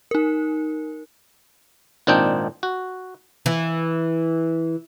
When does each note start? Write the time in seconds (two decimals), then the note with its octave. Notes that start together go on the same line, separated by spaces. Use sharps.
0.11 D#4 A#4
2.07 G#1 A#2 C4 D4 D#4 G5
2.63 F#4
3.46 E3